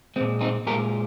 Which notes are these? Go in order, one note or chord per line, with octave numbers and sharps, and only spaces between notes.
A#2 G#3 C4
C4 D#4
A#2 G#3 G4 A#4